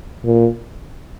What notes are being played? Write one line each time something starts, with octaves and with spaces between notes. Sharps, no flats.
A#2